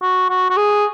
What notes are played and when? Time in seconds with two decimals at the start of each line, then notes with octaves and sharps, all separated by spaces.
0.02 F#4
0.29 F#4
0.50 F#4
0.57 G#4